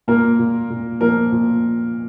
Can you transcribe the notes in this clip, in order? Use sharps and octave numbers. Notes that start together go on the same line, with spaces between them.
A#2 A#3 A#4
A#2
A#2
F3 A#3 A#4
A#2